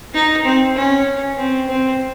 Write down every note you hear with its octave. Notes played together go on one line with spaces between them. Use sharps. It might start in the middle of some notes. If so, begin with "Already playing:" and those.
D#4
C4
C#4
C4
C4